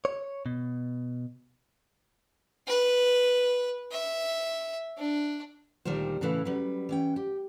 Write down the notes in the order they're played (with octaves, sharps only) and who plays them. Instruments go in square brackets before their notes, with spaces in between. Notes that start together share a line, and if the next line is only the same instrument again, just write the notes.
[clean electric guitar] C#5
B2
[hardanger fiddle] B4
E5
D4
[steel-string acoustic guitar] D2 A#2 D#3 G3 G4 C5
A2 C#3 E3 A4 B4 F5
F#3 G3 C#4 B4
E3 C#4 G5
G4